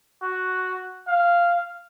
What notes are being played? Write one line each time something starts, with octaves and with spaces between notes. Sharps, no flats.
F#4
F5